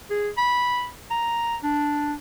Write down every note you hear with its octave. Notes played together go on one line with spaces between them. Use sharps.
G#4
B5
A#5
D4